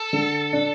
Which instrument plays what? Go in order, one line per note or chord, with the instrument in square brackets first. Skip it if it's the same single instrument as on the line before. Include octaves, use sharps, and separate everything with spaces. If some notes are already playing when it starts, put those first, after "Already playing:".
Already playing: [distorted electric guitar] A4
[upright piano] D3
D4